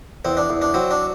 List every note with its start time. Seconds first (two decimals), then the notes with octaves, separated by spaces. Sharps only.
0.25 E2 C4
0.37 D4
0.49 E2
0.62 D4
0.74 F#3 C4
0.91 D4